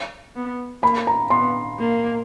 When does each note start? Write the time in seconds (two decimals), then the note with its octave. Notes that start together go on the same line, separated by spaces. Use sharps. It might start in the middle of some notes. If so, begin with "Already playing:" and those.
0.35 B3
0.82 A#3 B5
1.07 A#5
1.30 B3 C6
1.79 A#3